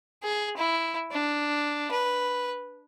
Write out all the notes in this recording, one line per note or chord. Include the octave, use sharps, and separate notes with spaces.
G#4
E4
D4
B4